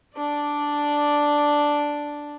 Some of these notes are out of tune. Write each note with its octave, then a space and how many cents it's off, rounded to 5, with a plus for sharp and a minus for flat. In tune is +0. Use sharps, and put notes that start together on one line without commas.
D4 +0 D5 +0